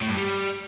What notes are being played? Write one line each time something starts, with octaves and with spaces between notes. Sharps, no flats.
A2
G2
G3